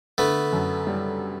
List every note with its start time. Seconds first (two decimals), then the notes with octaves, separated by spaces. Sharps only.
0.18 D3 A3 B3
0.53 F#2
0.87 G3